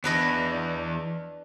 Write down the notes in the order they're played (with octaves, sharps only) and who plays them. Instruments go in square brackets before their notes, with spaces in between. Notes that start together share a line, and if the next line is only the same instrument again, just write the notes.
[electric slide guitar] E2 B3 [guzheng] D4 B4 D#5